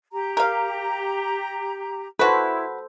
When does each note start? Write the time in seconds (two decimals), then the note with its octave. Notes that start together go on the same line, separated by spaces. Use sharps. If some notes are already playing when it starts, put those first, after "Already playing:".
0.12 G4 A#5
0.37 A#4 F5
2.19 E4 F#4 A4 B4 C5